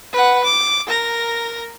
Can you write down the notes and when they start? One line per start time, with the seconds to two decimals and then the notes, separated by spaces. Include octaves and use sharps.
0.13 B4 F#5
0.44 D6
0.87 A#4 A#5